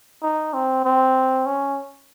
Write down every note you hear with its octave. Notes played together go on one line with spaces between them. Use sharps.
D#4
C4
C4
C#4